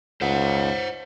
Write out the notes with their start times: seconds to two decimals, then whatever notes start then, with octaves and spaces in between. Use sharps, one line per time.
0.21 C#2 C5 F#5